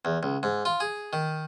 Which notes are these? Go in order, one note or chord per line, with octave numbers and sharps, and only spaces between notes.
E2
C#2
G#2
F4
G#4
D#3